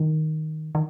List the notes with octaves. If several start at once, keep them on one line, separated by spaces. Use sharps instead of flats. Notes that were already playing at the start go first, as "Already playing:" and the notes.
Already playing: D#3
D#3